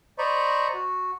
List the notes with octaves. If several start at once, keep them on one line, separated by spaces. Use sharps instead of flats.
C5 D5 D#5 A#5 B5 C#6
F#4